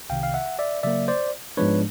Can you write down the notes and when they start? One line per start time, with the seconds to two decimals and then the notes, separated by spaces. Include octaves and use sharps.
0.10 C2 C3 D#3 F5 G5
0.23 F5
0.34 E5 F#5
0.59 D5 E5
0.83 C#3 F#3 A#3 D5 E5
1.08 C5 D5
1.57 G#2 F3 G#3 B3 D4 B4 C#5